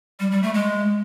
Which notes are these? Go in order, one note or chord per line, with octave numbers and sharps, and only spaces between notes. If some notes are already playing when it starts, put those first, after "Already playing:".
G3
G3
A3
G#3